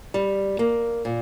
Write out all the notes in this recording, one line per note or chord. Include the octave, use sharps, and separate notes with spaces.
G3
A#3
A#2